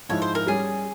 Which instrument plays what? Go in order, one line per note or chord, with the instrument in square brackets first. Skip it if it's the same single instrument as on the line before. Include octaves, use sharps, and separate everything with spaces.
[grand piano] G#2 F3 G#3 E4 [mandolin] C#5
[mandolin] C5
A#4
[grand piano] G3 C#4 G4 [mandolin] G#4